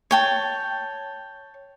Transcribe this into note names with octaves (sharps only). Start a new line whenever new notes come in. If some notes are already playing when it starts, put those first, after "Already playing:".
C#5 G5 A5